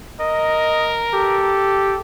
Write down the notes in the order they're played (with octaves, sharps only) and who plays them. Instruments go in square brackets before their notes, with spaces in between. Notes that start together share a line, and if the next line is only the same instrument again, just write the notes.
[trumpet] A#4 [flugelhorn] D#5
[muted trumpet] G4 [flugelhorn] A4